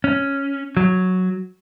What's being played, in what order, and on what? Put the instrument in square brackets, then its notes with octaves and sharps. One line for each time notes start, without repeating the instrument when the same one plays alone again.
[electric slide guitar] C#4
F#3